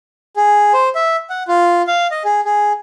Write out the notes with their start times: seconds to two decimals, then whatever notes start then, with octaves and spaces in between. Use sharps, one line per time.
0.37 G#4
0.74 C5
0.95 E5
1.30 F#5
1.48 F4
1.87 F5
2.11 D#5
2.25 G#4
2.45 G#4